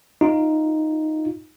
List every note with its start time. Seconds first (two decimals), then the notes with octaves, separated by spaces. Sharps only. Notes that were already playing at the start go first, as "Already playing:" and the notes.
0.21 D#4 F4